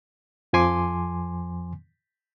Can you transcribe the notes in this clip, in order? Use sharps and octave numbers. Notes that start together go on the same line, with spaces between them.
F2 F3 G#5 C6 D6